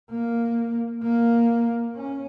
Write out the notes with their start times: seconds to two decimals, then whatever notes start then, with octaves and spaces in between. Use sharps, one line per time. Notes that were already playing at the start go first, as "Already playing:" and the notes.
0.10 A#3
1.03 A#3
1.95 C#4